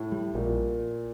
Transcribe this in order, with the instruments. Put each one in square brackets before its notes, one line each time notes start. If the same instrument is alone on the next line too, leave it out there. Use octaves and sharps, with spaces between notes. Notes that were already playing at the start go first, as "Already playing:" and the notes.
Already playing: [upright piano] A2
[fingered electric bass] G3
[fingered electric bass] A#1 [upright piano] A#2